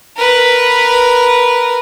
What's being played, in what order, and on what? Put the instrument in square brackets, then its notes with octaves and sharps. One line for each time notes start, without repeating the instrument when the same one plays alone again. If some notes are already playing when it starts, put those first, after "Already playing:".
[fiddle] A#4 B4